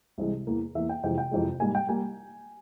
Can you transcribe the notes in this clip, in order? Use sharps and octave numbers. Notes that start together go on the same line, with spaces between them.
C2 C3 E3 G#3
E2 E3 A#3
E2 E3 A#3 E5
G5
F2 C3 E3 G#3 G5
G5
F2 C3 E3 G#3
G#2 G3 A#3 G#5
G5
G3 A#3 G#5